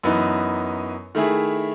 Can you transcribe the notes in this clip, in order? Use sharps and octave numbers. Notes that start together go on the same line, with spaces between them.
F#2 E3 B3 D#4
D#3 A3 E4 G#4